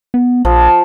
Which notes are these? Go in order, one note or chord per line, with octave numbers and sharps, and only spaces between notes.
B3
A#1 F3